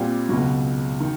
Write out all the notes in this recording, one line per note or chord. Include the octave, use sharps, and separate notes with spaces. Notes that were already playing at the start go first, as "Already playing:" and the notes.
Already playing: A#2 G3 C4 F4
C#2 B2 F#3
D#3